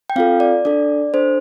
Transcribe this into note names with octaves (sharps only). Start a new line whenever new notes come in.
G5
C4 F4 A4 F5
D5
D4 A4 D5
D4 A4 C5